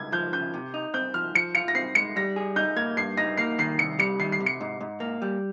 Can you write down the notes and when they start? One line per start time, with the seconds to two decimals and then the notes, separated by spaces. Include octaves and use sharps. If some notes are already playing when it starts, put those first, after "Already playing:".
Already playing: C#2 G#6
0.12 F3 G6
0.33 C#3 G6
0.54 C3
0.74 D#4
0.94 C4 G6
1.14 F3 F6
1.35 F3 C#7
1.55 F4 C#7
1.68 A#6
1.75 C4 C7
1.95 G#3 C#7
2.16 G3 A#6
2.36 G#4
2.56 D#4 G6
2.77 A#3 G#6
2.97 G2 C7
3.17 D#4 A#6
3.38 A#3 C7
3.59 D#3 C7
3.79 C2 C#7
3.99 G3 C#7
4.20 D#3 C7
4.32 C7
4.40 C3
4.46 C#7
4.60 G#2
4.81 G#2
5.00 A#3
5.22 G3